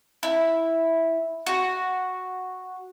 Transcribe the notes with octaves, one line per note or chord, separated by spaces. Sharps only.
E4
F#4